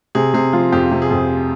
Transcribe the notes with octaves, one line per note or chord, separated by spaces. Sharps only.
C3 G#4
C3 G#4
F3 F4
F2 G4
C3
G#4
F2